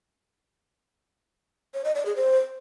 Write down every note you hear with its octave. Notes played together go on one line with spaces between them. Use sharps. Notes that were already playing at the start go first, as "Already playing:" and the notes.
C#5
D#5
D5
G#4
C5